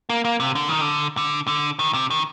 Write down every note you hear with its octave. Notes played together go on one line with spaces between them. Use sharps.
A#3
A#3
C3
D3
D#3
D3
D3
D3
D#3
C3
D#3